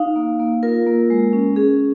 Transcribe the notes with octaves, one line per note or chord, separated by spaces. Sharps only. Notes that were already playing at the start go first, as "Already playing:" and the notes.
Already playing: D#4 F5
A#3
A#3
F4 A#4
A#3
G#3
C#4
C#4 G#4